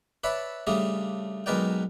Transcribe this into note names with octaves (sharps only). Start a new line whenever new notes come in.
B4 C#5 D5 E5 A5 B5
C#3 G3 A3 D4 G#4
B1 G#3 A#4 B4 D5 G5